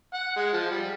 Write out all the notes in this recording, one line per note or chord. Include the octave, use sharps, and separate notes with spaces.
F#5
G#3
F3
G3